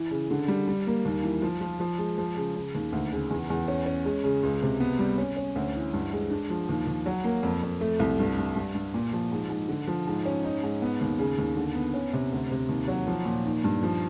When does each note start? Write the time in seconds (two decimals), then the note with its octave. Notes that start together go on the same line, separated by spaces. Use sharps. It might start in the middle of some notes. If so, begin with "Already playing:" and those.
Already playing: E3
0.11 C#3
0.31 D3
0.48 G3
0.68 G3
0.87 A#3
1.05 D#2
1.23 E3
1.42 F3
1.61 F3
1.80 F3
1.98 G#3
2.18 F3
2.37 C#3
2.56 C#3
2.75 D#2
2.93 D2
3.12 C#3
3.30 E2
3.50 E2
3.68 C#4
3.86 C#4
4.05 G#3
4.24 C#3
4.43 C#2
4.63 C3
4.80 B3
4.99 G3
5.18 C#4
5.37 C#4
5.56 D2
5.75 E3
5.93 G2
6.13 G#3
6.31 D4
6.50 F3
6.69 D#2
6.87 D#2
7.06 F#3
7.24 A#3
7.43 F2
7.63 F2
7.81 A3
7.99 C2
8.19 G2
8.38 G2
8.56 G2
8.75 G2
8.94 A#2
9.13 F3
9.32 G#2
9.50 G#2
9.69 D3
9.87 F3
10.07 G#2
10.26 C#4
10.44 D#4
10.63 G#2
10.82 B3
11.01 D#2
11.19 C#3
11.39 D#2
11.56 D3
11.75 B3
11.94 C#4
12.13 C3
12.32 D2
12.51 C3
12.69 D#2
12.88 F#3
13.07 F3
13.25 A#2
13.45 D#3
13.64 G2
13.83 F3